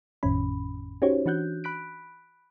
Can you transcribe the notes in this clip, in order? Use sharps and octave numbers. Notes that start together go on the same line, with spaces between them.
G#1 F2 A2 D#3 C#4 B5
C#4 D#4 F#4 G4 C5 C#5
E3 D4 F#4 F#6 G6
B5 F#6 B6 D7